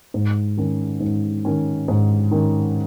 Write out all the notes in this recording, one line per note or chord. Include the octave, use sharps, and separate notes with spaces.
G#2
D#3 C#4
G#2
D#3 C#4
G#2
D#3 C#4